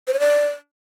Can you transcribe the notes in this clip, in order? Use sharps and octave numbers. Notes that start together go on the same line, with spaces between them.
C5
C#5
D5